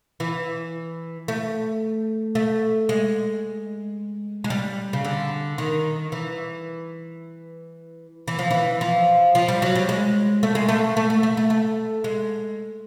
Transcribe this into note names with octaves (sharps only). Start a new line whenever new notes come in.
E3
A3
A3
G#3
G#3
G3
C#3
D3
D#3
E3
E3
F3
E3
F3
F3
G3
F#3
G3
G#3
A3
G#3
A3
A3
A3
A3
A3
A3
G#3